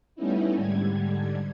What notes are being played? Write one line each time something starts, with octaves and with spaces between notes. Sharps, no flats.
G3 A3 B3 C#4 D#4 E4
G#2 D3 G3 G#6